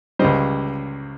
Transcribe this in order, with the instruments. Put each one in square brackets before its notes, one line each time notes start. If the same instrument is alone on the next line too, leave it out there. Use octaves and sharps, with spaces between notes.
[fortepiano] C#2 C#3 G3 C5 D#5